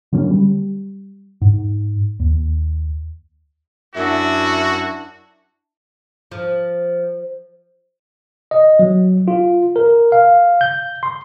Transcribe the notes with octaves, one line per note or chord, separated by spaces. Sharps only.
D3 F#3 A#3 C#4
G3
G#2
D#2
F#2 D4 E4 F#4 E5
F3
D#5
F#3
F4
A#4
F5
G6
C6